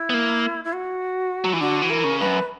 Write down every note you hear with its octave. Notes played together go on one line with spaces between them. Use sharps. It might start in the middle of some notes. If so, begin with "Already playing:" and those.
Already playing: E4
B3
A#3
E4
F#4
F#3
E3
D3 F#4
E3
A#4
C#3
G2 B4
F#2